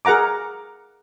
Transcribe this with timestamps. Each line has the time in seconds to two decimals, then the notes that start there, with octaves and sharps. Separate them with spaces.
0.05 G#4 A#4 F#5 A#5 D6